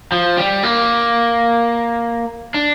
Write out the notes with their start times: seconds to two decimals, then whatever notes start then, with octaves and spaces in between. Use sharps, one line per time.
0.12 F3
0.37 G3
0.63 A#3
2.54 D4